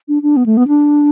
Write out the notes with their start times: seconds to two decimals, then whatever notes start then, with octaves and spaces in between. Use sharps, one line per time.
0.08 D4
0.22 D4
0.36 B3
0.46 A3
0.57 B3
0.68 D4